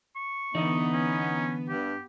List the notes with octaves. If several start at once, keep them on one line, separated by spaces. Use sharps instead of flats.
C#6
D3 E3 B3 D#4 D5
C#4
G2 G4